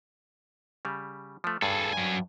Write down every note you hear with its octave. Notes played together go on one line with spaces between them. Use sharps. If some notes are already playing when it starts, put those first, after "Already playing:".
C#3 G3
F3 A3
G2 G#4 A4
F#3 G#5